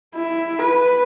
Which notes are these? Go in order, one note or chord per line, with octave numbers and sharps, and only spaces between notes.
E4
B4